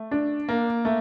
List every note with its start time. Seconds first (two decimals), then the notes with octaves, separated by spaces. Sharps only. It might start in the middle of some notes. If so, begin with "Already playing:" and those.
Already playing: A3
0.11 D4
0.49 A#3
0.85 A3